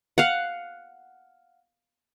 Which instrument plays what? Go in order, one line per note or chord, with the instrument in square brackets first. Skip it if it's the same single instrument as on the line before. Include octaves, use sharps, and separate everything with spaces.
[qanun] F5 F#5